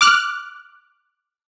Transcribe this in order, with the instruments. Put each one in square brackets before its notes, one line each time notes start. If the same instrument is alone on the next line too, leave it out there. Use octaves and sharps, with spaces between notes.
[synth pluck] D6 F6 F#6